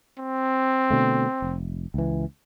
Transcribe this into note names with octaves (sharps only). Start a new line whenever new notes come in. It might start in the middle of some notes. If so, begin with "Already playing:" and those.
C4
B2 D3 A3
F1
C#2 E3